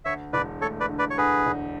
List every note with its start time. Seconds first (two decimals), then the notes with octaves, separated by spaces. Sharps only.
0.05 D2 C#5 E5
0.33 E1 B4 D5
0.62 A3 A4 C#5
0.80 B4 D5
0.89 D3
0.99 B4 D5
1.10 C#5
1.18 D2 G#4 B4
1.46 E1